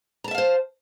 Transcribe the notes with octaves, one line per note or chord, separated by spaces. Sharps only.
C5 E5 F5 A5 A#5